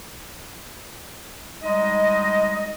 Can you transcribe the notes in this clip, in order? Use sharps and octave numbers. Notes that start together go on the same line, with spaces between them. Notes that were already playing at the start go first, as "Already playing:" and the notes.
G3 G#3 D#4 D#5